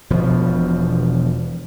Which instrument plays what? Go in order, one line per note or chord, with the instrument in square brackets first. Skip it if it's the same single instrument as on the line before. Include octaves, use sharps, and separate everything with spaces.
[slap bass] E1 B2 F3